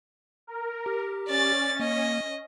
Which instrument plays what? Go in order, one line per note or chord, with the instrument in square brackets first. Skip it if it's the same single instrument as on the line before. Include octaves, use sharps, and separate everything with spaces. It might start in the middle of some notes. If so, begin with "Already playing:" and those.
[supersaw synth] A#4
[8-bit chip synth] G4
[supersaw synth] C#4 [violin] D5 A6
[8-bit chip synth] A#3 [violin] D#5